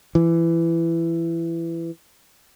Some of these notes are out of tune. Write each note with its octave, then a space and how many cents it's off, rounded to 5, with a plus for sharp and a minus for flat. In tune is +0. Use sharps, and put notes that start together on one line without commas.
E3 +20